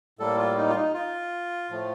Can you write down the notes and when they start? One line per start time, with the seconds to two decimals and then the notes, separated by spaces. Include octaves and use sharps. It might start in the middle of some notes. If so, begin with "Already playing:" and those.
0.19 A2 G3 A#3 A4
0.37 F4
0.57 D#4
0.69 F4
0.75 D#4
0.94 F4
1.70 A2 F3 A3